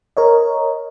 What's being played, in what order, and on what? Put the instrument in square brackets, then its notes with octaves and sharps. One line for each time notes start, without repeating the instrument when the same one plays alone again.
[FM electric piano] A#4 C#5 D#5